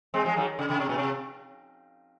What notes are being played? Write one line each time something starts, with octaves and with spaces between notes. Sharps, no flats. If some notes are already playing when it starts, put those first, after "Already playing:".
G#3 C4
F3 G#3
D#3 F#3
C#3
C#3
C3
A#2
C3